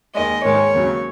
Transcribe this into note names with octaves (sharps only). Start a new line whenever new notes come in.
D#2 D#3 G#3 D#5
G#2 D#3 G#3 C#5
D#2 C#3 F#3